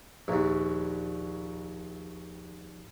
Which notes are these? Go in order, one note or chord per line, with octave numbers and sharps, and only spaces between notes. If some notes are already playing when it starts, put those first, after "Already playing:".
A#1 D#2